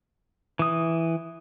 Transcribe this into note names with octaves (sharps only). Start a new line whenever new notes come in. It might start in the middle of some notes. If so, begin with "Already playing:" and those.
E3 D#6